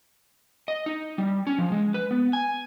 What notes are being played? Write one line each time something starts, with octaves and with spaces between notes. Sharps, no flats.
D#5
D#4
G3
C#4
F3
G#3
B4
B3
G#5